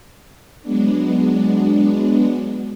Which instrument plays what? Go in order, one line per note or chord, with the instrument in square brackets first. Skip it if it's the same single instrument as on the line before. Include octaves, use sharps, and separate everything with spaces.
[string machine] F#3 G#3 B3 D4